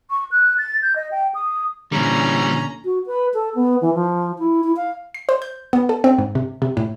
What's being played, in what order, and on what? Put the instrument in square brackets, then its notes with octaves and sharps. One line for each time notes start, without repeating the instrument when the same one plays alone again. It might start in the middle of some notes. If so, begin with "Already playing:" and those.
[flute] C#6
F#6
A6
G6
D#5
G5
D#6
[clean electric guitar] A#2 D3 [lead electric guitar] E3 G3 [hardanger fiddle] C#4 A#5
[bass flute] F#4
B4
A4
B3
E3
F3
E4
E4
F5
[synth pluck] C7
C5
G6
B3
A4
C4
G#2
C3
C3
A2